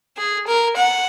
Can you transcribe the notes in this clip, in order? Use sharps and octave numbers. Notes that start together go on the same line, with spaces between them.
G#4
A#4
F#5